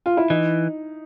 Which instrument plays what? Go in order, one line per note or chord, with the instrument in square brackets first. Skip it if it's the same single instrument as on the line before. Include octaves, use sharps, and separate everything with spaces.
[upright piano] F4
E4
[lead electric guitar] E3 [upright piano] D#4